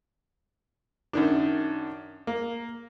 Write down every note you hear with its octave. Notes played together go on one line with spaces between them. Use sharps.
F#2 D#3 D4
A#3